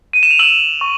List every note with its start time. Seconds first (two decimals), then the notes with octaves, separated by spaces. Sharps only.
0.13 D#7
0.23 E7
0.31 F7
0.39 E6 E7 F#7
0.81 C#6